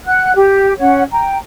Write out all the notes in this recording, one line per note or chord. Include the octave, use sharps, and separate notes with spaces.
F#5 F#6
G4
C#4 C#5 F#5
G5 A#5